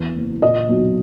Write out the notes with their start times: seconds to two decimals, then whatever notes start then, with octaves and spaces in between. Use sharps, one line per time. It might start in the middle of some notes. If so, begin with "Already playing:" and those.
Already playing: E2
0.16 F#1
0.42 A#2 D#5
0.69 B1